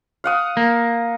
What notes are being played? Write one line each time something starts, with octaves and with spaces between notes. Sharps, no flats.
F5 F#5 D#6
A#3